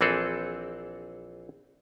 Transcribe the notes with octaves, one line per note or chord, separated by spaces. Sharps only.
A#1 E3 C4 G#4 A4